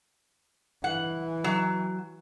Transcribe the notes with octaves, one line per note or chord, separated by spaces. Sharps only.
E3 F#5
F#3